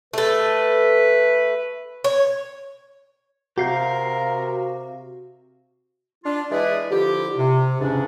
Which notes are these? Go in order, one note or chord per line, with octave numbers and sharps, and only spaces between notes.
A3 A4 B4
C#5
C3 F#4 G4 A#4 F5 G6
D4 F4
E3 G#3 E4 G#4 B4 D5
D3 F3 E4 G4
C3
E2 G#2 C#3 C#4 D4